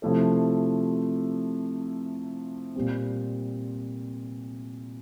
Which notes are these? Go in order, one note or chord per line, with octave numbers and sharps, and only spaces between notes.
C3 F3 A3 E4 A4
A#2 G3 C4